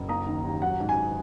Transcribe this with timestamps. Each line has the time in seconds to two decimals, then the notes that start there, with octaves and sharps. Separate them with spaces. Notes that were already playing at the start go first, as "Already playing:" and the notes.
Already playing: F#1
0.09 A#3 A#5 D#6
0.26 D#3
0.44 D#2
0.62 F#3 F#5
0.80 G#2
0.89 G#5